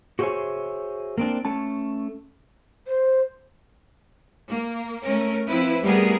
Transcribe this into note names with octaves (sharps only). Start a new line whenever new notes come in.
F#4 G#4 C5 C#5 E5 G#5
A#3 C4 D4
A3 C#4 A5
C5
A#3
A3 C#4 A#4
F3 C4 E4 B4
G3 A3 B3 G#4 A#4